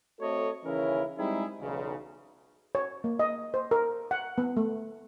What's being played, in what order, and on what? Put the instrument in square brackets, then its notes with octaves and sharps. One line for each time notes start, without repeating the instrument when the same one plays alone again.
[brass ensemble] A3 C4 F#4 A4 C#5 D#5
D#2 C#3 E3 C#4 E4 A#4
G3 G#3 C4 D#4 E4 G#4
B1 E2 C#3
[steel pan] C#5
A#3
D#5
C5
A#4
F#5
B3
A3